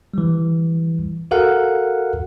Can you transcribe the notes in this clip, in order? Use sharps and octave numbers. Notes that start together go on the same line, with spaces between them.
E3 G3
F#4 A4 A#4 F5 F#5